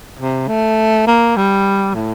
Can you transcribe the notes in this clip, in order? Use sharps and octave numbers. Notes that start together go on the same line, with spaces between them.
C3
A3
A#3
G3
A2